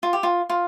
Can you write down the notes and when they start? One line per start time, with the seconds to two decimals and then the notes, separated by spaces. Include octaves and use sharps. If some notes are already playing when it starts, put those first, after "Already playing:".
0.03 F4
0.13 G4
0.23 F4
0.50 F4